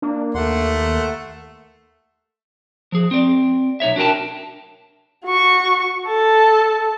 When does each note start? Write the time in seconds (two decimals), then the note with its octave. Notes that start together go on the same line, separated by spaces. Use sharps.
0.02 A#3 D4
0.35 D#2 A3 F#5 C6
2.92 F3 G#4
3.11 C4 D5
3.80 B1 D#4 C#5 E5
3.96 D4 F#4 A#4 G5 A5
5.25 F#4 C#6
6.07 A4 A5